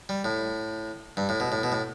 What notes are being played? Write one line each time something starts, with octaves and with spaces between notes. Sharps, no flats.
G3
A2
G2
A2
B2
A2
B2
A2